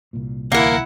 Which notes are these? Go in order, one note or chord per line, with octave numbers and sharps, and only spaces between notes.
C2 A#2
D2 E3 A#3 E4 A#4 F#5